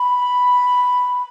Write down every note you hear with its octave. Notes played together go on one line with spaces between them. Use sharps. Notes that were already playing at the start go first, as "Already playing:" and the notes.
Already playing: B5